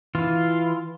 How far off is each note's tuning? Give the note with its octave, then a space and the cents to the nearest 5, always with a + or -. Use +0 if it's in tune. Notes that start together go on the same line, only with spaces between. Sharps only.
E3 +0 F4 +0